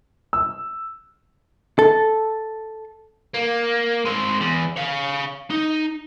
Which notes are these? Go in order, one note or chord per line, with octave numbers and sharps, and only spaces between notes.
E6
A4
A#3
G#3 C4
E2
C#5 F5
D#4